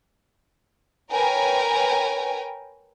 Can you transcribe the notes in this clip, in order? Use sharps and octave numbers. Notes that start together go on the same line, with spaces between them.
A#4 B4 C#5 G5 G#5